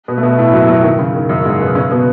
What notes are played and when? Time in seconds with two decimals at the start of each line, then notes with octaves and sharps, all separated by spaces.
0.08 B2 B3
0.18 A3
0.23 B2 B3
0.38 A2 A3
0.53 F#2 F#3
0.68 F#2 F#3
0.83 D#3
0.99 C#3
1.15 D#3
1.29 F#2 F#3
1.45 G#2 G#3
1.60 B2 B3
1.75 C#3 C#4
1.91 B2 B3